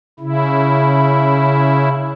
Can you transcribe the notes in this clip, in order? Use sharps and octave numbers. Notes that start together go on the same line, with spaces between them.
C#3 E4